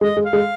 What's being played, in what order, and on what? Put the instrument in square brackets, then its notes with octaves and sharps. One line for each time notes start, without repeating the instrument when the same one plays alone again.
[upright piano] G#3 [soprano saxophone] D#5
[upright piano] G#3
[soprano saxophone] F5
[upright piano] G#3